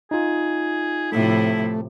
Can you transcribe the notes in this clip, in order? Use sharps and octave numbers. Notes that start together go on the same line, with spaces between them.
D#4 F4 G#4
A2 C3 F3 A3 E4